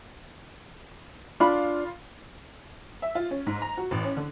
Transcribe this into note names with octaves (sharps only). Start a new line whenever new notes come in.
D4 F4 B5
E5
F4
C#4
G#2
A#5
F#4
A1
C#4
D3